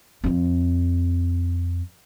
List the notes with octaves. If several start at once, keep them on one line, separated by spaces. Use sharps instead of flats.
F2 C4